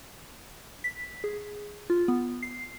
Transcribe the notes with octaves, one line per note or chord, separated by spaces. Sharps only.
B6
G#4
F4
B3
C7